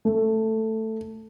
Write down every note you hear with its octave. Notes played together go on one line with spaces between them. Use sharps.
A3